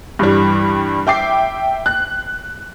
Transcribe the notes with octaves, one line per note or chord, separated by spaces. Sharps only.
G2 E3 G3
E5 G5 D6 C7
F#6